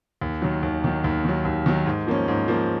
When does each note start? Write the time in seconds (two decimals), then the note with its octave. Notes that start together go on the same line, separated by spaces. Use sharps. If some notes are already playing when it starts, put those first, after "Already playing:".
0.21 D#2
0.42 D#3 F#3
0.63 D#2
0.84 D#3 F#3
1.04 D#2
1.25 D#3 F#3
1.45 D#2
1.66 D#3 F#3
1.86 G#2
2.07 F3 A#3 C#4
2.28 G#2
2.48 F3 A#3 C#4